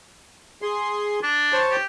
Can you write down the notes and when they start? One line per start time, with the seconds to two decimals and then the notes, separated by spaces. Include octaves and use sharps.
0.62 G#4 C6
1.23 D4
1.53 C5 C#5 A5
1.71 G4